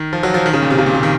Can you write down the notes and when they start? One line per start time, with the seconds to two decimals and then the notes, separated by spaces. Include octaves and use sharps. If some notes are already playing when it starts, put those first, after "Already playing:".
Already playing: D#3
0.13 F3
0.23 F#3
0.34 F3
0.46 D#3
0.53 C#3
0.62 A#2
0.70 C3
0.78 C#3
0.86 A#2
0.95 C3
1.03 D#3